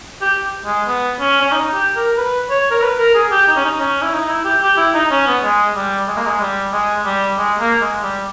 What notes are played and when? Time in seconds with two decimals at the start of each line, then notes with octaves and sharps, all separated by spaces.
0.21 G4
0.65 G#3
0.87 B3
1.20 C#4
1.41 C#4
1.52 D#4
1.74 G4
1.96 A#4
2.17 B4
2.50 C#5
2.71 A#4
2.82 B4
2.98 A#4
3.15 G#4
3.31 G4
3.47 D#4
3.56 C#4
3.65 D#4
3.80 C#4
4.02 E4
4.13 D#4
4.29 E4
4.45 G4
4.62 G4
4.77 E4
4.94 D#4
5.11 C#4
5.27 B3
5.44 G#3
5.75 G3
6.08 G#3
6.16 A#3
6.26 G#3
6.41 G3
6.73 G#3
7.05 G3
7.38 G#3
7.59 A#3
7.81 G#3
8.03 G3